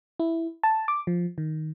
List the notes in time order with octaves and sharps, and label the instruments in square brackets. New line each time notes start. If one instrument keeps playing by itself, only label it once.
[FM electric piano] E4
A5
D6
F3
D#3